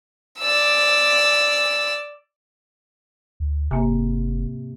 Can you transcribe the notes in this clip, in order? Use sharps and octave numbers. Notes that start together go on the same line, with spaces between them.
D5 E6
D2
F#1 G#2 C3 A#3 G#5